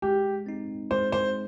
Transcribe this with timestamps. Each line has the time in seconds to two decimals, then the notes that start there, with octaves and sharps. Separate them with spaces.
0.02 G#3 G4
0.46 C4 D#4
0.91 G#3 C5
1.12 C5